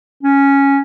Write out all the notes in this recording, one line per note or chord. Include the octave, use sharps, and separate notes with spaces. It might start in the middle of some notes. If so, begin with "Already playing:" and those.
C#4